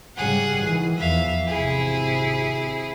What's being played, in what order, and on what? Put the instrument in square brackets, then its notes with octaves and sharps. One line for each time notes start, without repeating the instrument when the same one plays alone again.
[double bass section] G#2 C#3 G3 [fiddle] G#4 F#5
[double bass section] D#3 E3
[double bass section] E2 E3 F3 [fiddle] E5 F5
[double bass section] G#1 C3 [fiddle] E4 G#4